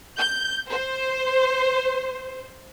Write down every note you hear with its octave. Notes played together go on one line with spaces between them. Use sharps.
G6
C5